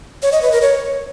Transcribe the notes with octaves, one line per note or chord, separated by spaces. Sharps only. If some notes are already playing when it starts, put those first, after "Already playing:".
C#5
D#5
B4
A#4
C#5